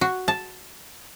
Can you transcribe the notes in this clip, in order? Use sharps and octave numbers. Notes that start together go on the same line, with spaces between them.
F#4
A5